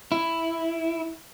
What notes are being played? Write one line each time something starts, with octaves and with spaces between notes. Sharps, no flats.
E4